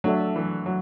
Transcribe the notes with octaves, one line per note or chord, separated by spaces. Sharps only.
F#3 A3 D4 A4 E5
E3
F#3